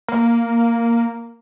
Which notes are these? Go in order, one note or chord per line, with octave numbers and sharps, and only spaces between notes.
A#3